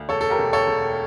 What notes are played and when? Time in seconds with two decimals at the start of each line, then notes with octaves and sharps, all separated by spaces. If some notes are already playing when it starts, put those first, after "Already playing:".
Already playing: D2
0.09 E1 A4 C#5
0.21 A4
0.30 G4 A#4
0.39 E1
0.53 A4 C#5
0.67 E1